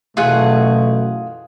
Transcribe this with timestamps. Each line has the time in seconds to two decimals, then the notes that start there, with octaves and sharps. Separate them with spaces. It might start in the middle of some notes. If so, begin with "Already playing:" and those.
0.17 F#2 B2 E3 A3 F4 G#4 F#5